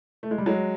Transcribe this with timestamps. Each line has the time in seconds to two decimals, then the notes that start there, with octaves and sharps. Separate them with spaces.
0.23 A3
0.31 G#3
0.38 G3
0.46 F#3 G#3